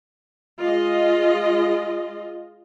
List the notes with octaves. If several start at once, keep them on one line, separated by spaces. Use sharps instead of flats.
G#3 F4 D#5